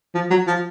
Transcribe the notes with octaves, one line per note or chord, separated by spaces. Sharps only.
F3
F#3
F3